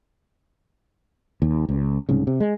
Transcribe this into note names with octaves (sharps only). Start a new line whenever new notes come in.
D#2
C#2
C2 G#2 C#3
C3
G#3